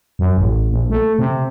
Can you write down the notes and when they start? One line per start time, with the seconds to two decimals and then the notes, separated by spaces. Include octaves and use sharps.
0.19 F#2
0.38 A1
0.71 A#1
0.90 A3
1.19 C3